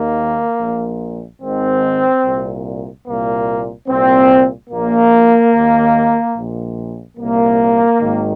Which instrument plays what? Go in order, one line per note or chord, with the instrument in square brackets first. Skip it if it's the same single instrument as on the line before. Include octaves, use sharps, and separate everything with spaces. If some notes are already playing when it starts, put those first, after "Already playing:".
Already playing: [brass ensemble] D#2 D#3 A#3
A#1 A#2
G#1 G#2 D#3 C4
C2 A#2
C2 A#2 A#3
C2 A#2 C4
A#1 A#2 A#3
D#2 D#3
A#1 A#2
C2 A#2 A#3
G#1 G#2 D#3